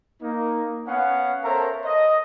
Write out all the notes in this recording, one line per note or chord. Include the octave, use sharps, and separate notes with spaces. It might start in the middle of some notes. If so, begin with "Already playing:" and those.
A#3 D#4
B3 C#4 F5 F#5
A4 A#4 C5 C#5 E5 A#5
D#5